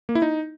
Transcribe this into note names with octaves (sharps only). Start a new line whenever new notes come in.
A#3
E4
D#4